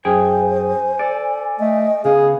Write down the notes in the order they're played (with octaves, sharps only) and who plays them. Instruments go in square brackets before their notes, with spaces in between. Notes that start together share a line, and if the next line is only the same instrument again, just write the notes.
[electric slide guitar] F#2 G#4 G5 [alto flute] C5 [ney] G#5
[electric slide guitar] A4 D5
[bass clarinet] A3 [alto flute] D#5
[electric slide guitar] C#3 B3 [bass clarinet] G#4 [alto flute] F5